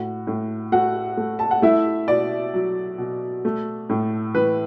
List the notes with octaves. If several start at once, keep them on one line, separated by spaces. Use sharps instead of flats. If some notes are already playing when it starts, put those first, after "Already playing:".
Already playing: A2 F#4
A2
A3 F#4 F#5
A3
A5
F#5
A3 E4 E5
B2 D5
F#3
B2
A3
A2
E3 B4